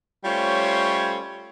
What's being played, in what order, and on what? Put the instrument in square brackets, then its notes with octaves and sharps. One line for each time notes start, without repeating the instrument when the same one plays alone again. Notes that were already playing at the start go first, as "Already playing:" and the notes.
[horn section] G3 A3 C#4 F4 C5 C#5